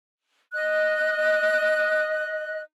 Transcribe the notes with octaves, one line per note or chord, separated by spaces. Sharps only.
D#5 F#6